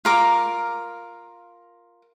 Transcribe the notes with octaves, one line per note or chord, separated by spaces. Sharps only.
F4 A#4 D6